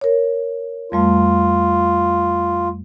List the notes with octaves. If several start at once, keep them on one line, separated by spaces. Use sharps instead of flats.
A#4 C#5
F2 G3 A3 F4